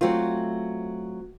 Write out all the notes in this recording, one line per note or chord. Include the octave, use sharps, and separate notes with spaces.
F#3 A3 C4 F4